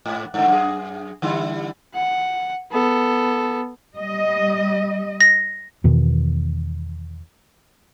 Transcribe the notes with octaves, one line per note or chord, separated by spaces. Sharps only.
G#2
G2 D3
F#2 G#4
D3 G3 E4
F#5
B3 A4
G3 D#5
A#6
E2 B2 D#3 E3